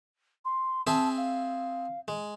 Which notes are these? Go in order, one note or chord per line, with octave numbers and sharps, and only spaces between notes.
C6
C4 G#4 E5 A5
F5
G#3